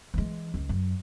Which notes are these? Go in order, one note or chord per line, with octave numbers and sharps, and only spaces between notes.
E3 G#3
C#2
F#2